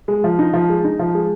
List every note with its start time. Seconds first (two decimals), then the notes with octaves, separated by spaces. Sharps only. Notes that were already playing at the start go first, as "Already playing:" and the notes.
0.08 G#3
0.24 F3
0.39 D#4
0.53 F3
0.69 G#3
0.84 D#4
0.99 F3
1.14 G#3